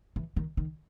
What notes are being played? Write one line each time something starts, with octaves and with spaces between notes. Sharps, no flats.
E3
D#3
D#3